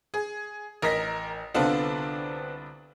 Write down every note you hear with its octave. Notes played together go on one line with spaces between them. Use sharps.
G#4
A1 A#4 D#5 A#6 B6
C2 D3 B3 C4 D4 F4